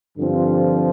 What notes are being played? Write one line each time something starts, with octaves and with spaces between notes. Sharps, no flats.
G2 D3 F3 C4 F4